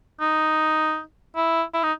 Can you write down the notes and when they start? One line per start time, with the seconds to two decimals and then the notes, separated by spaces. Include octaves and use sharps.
0.20 D#4
1.36 E4
1.74 E4
1.83 D#4